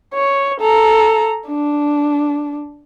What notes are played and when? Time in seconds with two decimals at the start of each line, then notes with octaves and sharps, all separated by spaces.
0.15 C#5
0.60 A4 A#5
1.48 D4